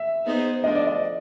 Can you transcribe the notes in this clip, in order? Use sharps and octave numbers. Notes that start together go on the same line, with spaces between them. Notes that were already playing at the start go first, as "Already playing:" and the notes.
Already playing: E5
B3 D#4 G#4 C5
F3 A3 D4 D#5
D5
D#5